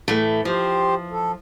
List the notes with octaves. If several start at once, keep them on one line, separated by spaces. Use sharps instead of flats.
A2 E3 A3
F3 G4 C5
A4